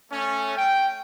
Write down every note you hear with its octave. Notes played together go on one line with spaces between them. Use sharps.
A3 C#4
G5